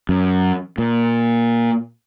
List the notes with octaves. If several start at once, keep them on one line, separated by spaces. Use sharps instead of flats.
F#2
A#2